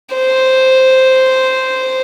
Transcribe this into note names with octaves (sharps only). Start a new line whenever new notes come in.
C5